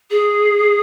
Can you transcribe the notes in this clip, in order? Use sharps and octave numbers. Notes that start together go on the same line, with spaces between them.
G#4